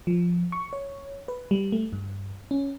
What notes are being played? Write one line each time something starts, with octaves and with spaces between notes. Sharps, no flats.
F3
C#6
C#5
B4
G3
A3
G2
C#4